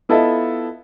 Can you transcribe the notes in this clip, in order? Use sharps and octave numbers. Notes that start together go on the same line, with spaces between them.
B3 E4 F4 A4 D#5 E5